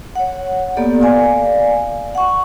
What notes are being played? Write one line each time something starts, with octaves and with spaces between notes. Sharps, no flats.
C#5 F#5
A#3 B3 G4 A4 D5
D5 F5 G#5
F#5 C#6